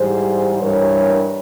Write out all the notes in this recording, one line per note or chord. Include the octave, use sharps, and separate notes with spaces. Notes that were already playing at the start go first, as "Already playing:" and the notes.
Already playing: G#2 E3 G3 G#4 C5
G2 E3 G3 A#4 C#5